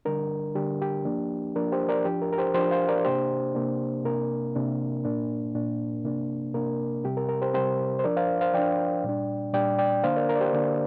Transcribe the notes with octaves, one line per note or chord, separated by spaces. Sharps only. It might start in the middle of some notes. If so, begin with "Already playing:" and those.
D3 G3 D4 A#4
D3 G3 D4 G4
G4
F3 A#3 D4
F3 A#3 D4 A#4
G4 C5
A#4 D5
F3 D4 G4
A#4
A#4
G4 C5
F3 D4 G4 C5
C5 F5
A#4 D5
C3 A#3 D4 G4 C5
C3 A#3 D4
C3 A#3 D4 A#4
C3 A#3 D4
A#2 A#3 D4
A#2 A#3 D4
C3 A#3 D4
C3 A#3 D4 A#4
C3 G3 C4 G4
A#4
A#4
G4 C5
C3 G3 C4 G4 C5
C5
F3 D4 A#4 D5
C5 F5
C5 F5
F3 D4 D5 G5
A#2 G3 D4
A#2 G3 D4 D5 G5
D5 G5
D3 A#3 D4 C5 F5
A#4 D5
A#4
D5
G4 C5
D3 A#3 D4